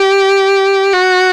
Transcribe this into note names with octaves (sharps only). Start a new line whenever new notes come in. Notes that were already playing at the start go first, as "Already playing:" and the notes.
Already playing: G4
F#4